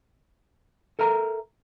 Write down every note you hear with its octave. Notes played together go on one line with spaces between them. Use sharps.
A4 A#4 E5 A#5